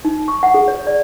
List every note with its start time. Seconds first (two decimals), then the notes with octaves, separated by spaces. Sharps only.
0.05 D#4
0.28 C#6
0.43 F#5
0.54 G#4
0.68 C#5
0.87 D5